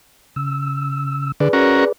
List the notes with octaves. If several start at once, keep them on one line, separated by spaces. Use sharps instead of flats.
C#3 E6
D3 G#4 B4 D5
C#4 F#4 A#4